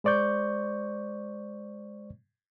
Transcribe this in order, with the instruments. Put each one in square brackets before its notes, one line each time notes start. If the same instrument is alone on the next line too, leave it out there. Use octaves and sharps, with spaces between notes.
[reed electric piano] G#3 C5 D5 C#6 G6